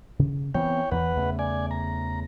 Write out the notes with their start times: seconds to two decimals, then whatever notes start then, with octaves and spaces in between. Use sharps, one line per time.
0.19 C#3
0.54 E3 B3 C4 C#5 G5
0.91 E2 E3 B4 F#5
1.17 E2 C#3 A3
1.39 D5 G#5
1.71 A#5